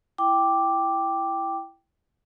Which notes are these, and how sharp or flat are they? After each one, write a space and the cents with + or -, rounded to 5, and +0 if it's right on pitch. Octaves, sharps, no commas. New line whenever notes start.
E4 +15 G5 +0 D6 +0